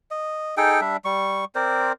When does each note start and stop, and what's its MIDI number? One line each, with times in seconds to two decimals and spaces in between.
0.11 0.55 75
0.57 0.81 63
0.57 0.81 68
0.57 0.81 69
0.57 0.81 79
0.81 0.97 55
0.81 0.97 62
0.81 0.97 76
1.05 1.45 55
1.05 1.45 85
1.55 1.92 60
1.55 1.92 70
1.55 1.92 72
1.55 1.92 74